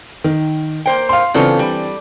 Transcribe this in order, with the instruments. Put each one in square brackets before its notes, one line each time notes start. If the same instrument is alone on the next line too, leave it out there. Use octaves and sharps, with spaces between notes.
[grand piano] D#3
[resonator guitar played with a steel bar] A#3 C5 G5
[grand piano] F5 C6
[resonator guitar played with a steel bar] C#3 F4 A4 [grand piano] E3 C4 D4
[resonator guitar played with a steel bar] G3